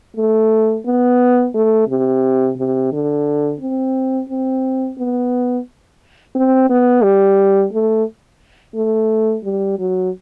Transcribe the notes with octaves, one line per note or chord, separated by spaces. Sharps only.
A3
B3
A3
C3
C3
D3
C4
C4
B3
C4
B3
G3
A3
A3
G3
F#3